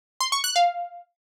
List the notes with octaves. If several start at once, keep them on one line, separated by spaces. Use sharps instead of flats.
C6
C#6
F#6
F5